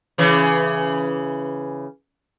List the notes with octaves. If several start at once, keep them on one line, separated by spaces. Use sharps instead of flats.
C#3 E3